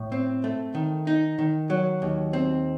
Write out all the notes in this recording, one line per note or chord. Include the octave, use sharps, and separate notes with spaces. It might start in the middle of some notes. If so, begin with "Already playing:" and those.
Already playing: A2
C4
A3
D#3
D#4
D#3
F#3
D#2
C4